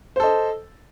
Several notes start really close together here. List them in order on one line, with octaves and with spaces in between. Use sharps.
C5 A4 D#5